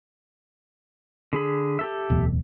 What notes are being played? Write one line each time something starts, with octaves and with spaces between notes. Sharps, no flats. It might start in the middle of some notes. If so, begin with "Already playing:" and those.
D3 G#4 B5
G4 A4 E5
D1 E2 B2